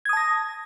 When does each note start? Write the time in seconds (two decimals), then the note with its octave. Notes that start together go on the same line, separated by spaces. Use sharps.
0.05 G#6
0.09 D#6
0.13 A5
0.17 A#6